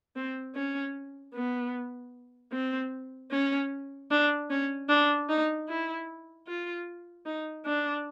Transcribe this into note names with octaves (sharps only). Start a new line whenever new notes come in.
C4
C#4
B3
C4
C#4
D4
C#4
D4
D#4
E4
F4
D#4
D4